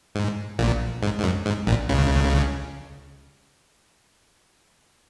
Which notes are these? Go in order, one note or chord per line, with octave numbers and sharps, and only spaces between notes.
G#2
A#1 A#2
G#2
G#2
F#2
G#2
A#1 A#2
C#2 C#3